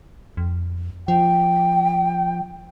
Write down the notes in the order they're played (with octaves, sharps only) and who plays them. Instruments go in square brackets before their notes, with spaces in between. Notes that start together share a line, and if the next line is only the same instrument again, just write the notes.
[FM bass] F2
[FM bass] F3 [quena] G5